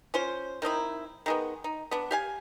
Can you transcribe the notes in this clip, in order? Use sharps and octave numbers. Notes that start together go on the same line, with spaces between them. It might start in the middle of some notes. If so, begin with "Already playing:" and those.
C#4 F4 C5
D#3 C4 D#4 E4
D#3 G#3 B3
D#4
B3 D4
G4 F5 G#5